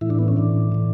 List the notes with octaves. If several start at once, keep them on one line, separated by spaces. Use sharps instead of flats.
A2 E3 E4
D4
B3
C#4
A2 E3 D4
A2 E3